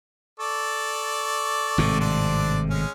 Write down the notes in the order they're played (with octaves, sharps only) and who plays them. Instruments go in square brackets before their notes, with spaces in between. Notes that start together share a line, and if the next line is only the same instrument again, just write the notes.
[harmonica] A4 D5 C#6
[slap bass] G#1 A2 C3
[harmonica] C4 D4 D5
G#3 C#4